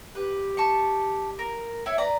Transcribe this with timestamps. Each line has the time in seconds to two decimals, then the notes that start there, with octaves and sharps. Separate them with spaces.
0.15 G4 B4
0.57 A5 C#6
1.39 A#4
1.86 E4 C#5
1.98 B4 D5 A#5